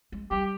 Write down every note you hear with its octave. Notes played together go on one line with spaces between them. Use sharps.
G#3
G3 G4